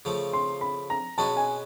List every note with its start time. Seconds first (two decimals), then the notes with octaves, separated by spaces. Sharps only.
0.05 C#3 F3 A3
0.33 C6
0.61 B5
0.90 A#5
1.18 B2 G#3 C#4 F#4 B4 A5
1.36 G#5